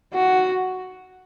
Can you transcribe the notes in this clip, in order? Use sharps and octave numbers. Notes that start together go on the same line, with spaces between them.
F#4